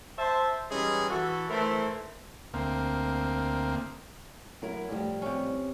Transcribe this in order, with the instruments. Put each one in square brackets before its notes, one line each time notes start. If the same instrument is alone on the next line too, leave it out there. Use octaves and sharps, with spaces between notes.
[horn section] C5 E5 A5
E3 G3 G#3 C#4 D#4 G#4
E3 F#4 A4
E3 A3 E4 A#4 C5
[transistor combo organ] D2 A#3 C4
[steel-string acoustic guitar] F#3 E4 A#4
A2 F3 G3
[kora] C3 C#4